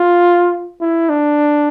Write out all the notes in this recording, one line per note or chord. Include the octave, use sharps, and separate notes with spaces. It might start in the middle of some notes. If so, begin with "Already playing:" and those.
Already playing: F4
E4
D4